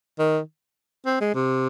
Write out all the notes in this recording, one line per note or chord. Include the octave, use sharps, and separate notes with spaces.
D#3
C4
G#3
C3